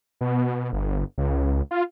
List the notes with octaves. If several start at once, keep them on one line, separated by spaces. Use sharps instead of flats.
B2
G1
C#2
F4